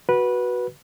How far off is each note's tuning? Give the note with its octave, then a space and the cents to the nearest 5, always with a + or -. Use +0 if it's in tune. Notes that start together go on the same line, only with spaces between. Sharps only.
F#4 +0 B4 -15